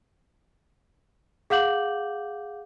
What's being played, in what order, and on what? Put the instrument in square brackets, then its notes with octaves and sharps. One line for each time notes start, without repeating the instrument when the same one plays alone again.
[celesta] G#4 F5 F#5 D6 G6 F#7